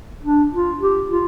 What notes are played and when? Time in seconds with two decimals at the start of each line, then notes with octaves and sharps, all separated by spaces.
0.23 D4
0.53 F4
0.81 G4
1.09 F4